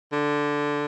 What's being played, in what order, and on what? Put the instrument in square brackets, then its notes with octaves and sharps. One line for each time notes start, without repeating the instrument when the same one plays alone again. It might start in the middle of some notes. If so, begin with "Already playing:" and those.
[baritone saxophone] D3